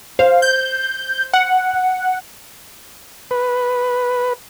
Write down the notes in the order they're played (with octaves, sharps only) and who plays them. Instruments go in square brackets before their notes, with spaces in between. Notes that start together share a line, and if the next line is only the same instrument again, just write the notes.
[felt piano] C5 [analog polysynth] F5
[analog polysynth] G6
F#5
[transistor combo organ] B4